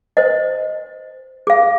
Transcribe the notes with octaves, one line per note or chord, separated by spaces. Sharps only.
C5 D#5
G#4 F5